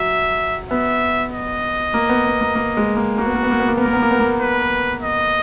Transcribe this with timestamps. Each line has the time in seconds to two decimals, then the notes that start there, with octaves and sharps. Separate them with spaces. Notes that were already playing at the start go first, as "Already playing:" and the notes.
Already playing: F#3 E5
0.71 B3 E5
1.33 D#5
1.94 A#3
2.09 B3
2.26 B3
2.41 A#3
2.55 A#3
2.77 G#3
2.97 A#3
3.18 A#3 F#4
3.26 B3
3.35 A#3
3.43 B3
3.51 A#3
3.60 B3
3.68 A#3
3.77 B3 A#4
3.86 A#3
3.93 B3
4.02 A#3
4.11 B3
4.20 A#3
4.41 B4
5.02 D#5